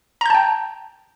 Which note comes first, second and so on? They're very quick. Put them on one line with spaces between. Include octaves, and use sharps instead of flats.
A#5 G6 A5 G5